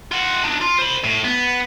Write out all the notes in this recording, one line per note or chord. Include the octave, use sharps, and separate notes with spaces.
F4 F#5
D4 D#4
F4
C5 B5
A2
B3